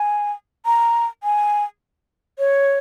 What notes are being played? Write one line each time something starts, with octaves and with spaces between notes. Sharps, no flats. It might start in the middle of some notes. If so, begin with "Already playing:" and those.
Already playing: G#5
A#5
G#5
C#5